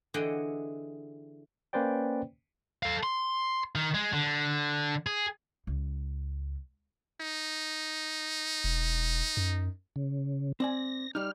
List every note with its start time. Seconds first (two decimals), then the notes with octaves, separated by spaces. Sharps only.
0.14 D3 E3 G#4 D#5 F#5 G5
1.73 A#3 C#4 B4 C5 D5 G5
2.83 A4 F5
3.03 C6
3.75 D#3
3.94 G#3
4.13 D3
5.07 G#4
5.67 C#2
7.21 D#4
8.64 E1
9.37 F#2
9.96 C#3
10.60 C4 D5 G#5 A#6
11.15 G3 D#4 F6